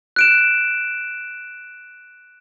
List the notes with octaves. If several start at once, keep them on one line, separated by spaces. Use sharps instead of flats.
F#6 D7 E7